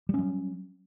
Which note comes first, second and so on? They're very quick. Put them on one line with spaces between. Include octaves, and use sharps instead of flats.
G3 C#4 F#3